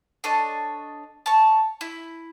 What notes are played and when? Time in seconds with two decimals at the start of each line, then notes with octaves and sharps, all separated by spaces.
0.24 D4 A4 C#5 D#5
1.26 C#5 A5
1.81 E4